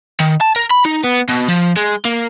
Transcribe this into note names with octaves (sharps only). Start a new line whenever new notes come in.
D#3
A5
A#4
B5
D#4
B3
B2
F3
G#3
A#3